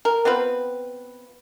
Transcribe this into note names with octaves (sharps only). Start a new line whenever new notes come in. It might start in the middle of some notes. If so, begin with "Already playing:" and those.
A#4
B3 C4 F4 B4